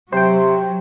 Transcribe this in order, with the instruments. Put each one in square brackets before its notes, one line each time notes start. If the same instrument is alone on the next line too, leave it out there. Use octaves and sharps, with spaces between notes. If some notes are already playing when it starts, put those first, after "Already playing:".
[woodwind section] C3 [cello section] F#3 [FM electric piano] C5 G5